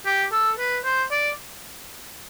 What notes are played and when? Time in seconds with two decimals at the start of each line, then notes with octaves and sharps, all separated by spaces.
0.06 G4
0.33 A4
0.59 B4
0.85 C5
1.12 D5